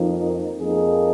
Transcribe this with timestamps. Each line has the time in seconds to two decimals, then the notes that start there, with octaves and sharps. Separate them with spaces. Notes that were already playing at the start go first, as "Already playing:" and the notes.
Already playing: F2 F3 A#3 D#4
0.59 F2 F3 A#3 D#4 G#4